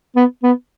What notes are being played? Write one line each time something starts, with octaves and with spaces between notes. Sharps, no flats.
B3
B3